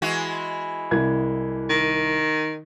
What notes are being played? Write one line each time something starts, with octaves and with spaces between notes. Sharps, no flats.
E3 G#3 F#4
C2 G#6
D#3